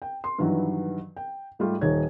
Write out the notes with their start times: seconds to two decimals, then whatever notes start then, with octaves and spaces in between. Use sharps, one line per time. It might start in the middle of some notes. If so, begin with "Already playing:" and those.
0.02 G5
0.24 C6
0.38 G2 D#3 E3 F#3
1.16 G5
1.59 G#2 G3 A3 F4 G4
1.81 D#1 D#4 A4 C#5 G#6